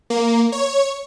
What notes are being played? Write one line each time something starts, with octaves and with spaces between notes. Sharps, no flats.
A#3
C#5